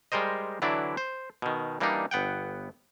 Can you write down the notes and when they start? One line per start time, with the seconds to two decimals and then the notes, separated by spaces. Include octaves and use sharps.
0.12 G3 G#3 A#4 C5 D#5
0.62 D3 E3 F#3 D4 E4 D5
0.97 C5
1.42 B2 D#3
1.80 E3 G3 A#3 D4 D#4
2.11 G1 B3 F#5 G5